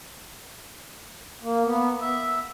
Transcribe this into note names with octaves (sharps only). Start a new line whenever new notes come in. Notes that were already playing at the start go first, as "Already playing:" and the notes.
A#3
B3
E5